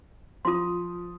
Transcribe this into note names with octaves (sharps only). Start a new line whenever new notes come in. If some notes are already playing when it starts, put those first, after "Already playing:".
F3 F4 C6 D#6